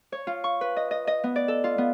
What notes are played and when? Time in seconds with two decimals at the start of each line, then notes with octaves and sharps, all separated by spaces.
0.12 C#5
0.27 F4
0.44 C#6
0.61 B4
0.77 D#5
0.91 D#5
1.07 D#5
1.24 B3
1.36 D5
1.48 A4
1.64 F4
1.78 B3